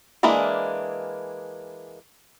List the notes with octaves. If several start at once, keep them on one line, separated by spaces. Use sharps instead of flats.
E3 G#3 A#3 D4 E4